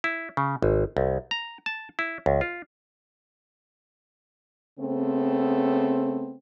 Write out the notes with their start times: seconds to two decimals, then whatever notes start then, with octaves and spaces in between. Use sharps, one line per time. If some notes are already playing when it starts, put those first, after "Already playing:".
0.04 E4
0.37 C#3
0.62 G#1
0.97 C2
1.31 A#5
1.66 A5
1.99 E4
2.26 C#2
2.41 F4
4.79 C#3 A3 B3 C4